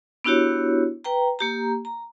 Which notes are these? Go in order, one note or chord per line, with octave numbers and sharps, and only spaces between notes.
B3 D4 E4 F#4 G4 C#5
B4 G5 A#5
A#3 G4 A#5
A#5